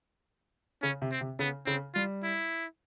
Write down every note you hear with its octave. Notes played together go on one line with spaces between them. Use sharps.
C#3 C#4
C3
C4
C3
C#3 B3
C#3 C4
G3 F4
E4